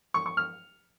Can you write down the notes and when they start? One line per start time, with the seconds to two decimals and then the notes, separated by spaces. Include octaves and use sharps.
0.14 C#6
0.26 C#6
0.37 F6